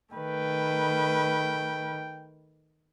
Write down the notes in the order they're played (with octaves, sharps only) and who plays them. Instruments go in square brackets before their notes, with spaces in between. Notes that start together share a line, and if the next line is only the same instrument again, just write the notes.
[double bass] D#3 [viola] A3 B4 [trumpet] G5